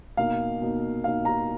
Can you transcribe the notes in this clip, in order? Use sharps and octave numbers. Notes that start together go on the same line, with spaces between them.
B2 A#3 D#4 F5
B2 A#3 D#4
B2 A#3 D#4 F5
A#5